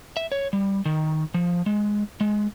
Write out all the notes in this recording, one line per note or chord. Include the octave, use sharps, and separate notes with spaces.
E5
C#5
G3
D#3
F3
G#3
G#3